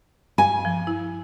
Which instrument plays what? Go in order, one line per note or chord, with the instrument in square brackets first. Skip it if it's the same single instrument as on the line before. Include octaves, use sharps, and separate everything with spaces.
[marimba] G2 F5 [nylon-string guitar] G#5
[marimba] F3
E4